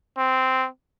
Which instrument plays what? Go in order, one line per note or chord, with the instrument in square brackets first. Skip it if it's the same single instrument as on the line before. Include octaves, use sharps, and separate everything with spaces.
[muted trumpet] C4